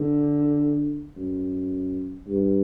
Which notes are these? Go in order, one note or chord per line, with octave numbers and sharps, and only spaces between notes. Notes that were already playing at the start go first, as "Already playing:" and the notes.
Already playing: D3
F#2
G2